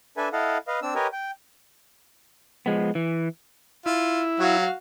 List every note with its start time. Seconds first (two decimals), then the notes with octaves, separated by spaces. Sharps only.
0.17 D4 A4 B4 E5 G#5
0.33 E4 A4 D#5 F5 F#5
0.67 B4 D#5 F5
0.82 C4 D4 E6
0.95 G4 A#4 B4 C#5 D#5 G#5
1.13 G5
2.66 F3 G#3 B3
2.95 E3
3.86 E4 F4
4.40 F#3 F#4 F5